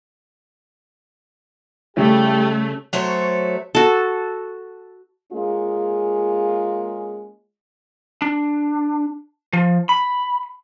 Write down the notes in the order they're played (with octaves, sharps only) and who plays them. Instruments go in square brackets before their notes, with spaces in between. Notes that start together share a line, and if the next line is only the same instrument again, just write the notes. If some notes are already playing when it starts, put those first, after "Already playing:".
[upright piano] C#3 G3 C#4 [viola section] A3 [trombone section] E4 G4
[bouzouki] F#3 A3 C5 C#5
[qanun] F#4 A4
[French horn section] G#3 A#3 C#4 F4 G#4
[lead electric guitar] D4
F3
B5